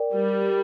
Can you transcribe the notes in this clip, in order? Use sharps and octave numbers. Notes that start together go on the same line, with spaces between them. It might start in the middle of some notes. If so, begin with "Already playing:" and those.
Already playing: A#4 D5 G5
G3 A#4